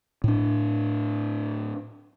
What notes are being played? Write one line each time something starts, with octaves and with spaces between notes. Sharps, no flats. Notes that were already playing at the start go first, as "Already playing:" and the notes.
A2 D4